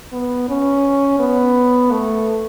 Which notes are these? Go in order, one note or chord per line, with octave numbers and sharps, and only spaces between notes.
B3
C#4
B3
A3